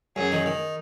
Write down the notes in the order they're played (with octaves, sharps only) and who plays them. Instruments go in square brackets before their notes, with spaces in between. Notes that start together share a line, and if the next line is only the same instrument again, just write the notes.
[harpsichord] F#2 [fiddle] G#4
[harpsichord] D#3
D#3